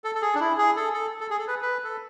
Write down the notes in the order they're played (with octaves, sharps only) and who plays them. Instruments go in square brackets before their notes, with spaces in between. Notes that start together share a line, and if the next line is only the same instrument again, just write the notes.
[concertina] A4
A4
G#4
D4
E4
G#4
A4
A4
A4
G#4
A4
B4
B4
A4